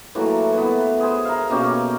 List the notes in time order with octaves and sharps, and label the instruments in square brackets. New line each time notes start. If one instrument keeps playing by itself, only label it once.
[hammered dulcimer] E3 F#3 A3 A#3
E3 B3
G#4 C5
A#4 F5
B2 A#3 C#4 G4